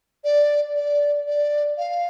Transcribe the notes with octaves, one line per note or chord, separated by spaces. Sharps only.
D5
D5
D5
F5